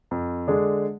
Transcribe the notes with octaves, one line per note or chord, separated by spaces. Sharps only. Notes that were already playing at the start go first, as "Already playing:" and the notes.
F2
D3 G#3 D4 G#4